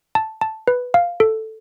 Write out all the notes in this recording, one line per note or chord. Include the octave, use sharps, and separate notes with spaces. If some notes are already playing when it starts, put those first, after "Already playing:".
A5
A5
B4
F5
A4